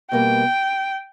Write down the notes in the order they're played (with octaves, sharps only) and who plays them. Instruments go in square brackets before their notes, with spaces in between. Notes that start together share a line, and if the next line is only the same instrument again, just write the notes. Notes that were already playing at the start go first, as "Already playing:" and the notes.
[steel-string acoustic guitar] B2 G3 A#3 [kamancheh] G5